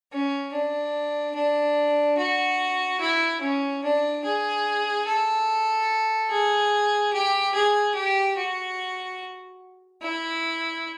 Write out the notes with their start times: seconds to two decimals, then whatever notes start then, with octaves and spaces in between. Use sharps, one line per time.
0.12 C#4
0.53 D4
1.36 D4
2.18 F#4
3.01 E4
3.42 C#4
3.84 D4
4.25 G#4
5.07 A4
6.31 G#4
7.13 G4
7.55 G#4
7.95 G4
8.37 F#4
10.02 E4